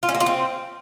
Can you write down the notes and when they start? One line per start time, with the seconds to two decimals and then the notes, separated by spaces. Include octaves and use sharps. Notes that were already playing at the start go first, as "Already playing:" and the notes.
0.03 F4
0.09 C#4
0.15 A#3
0.20 F4
0.26 C4